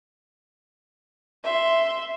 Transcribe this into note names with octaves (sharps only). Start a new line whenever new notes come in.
E5 C6